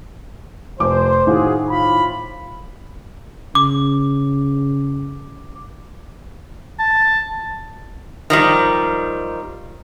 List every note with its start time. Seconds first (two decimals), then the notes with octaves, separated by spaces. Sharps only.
0.80 F1 C5 D6
1.27 A2 D#3 F4 F#4 G#4
1.69 F4 C5 B5
3.55 C#3 D6
6.79 A5
8.30 D#3 F3 G3